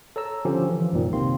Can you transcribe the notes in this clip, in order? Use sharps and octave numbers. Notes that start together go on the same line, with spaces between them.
A4 C#5 A#5 E6
D3 F3 C#4 G4
E3 F3
C2 F#2 A#2 D#3
C3 D#3 A#3 C4 C6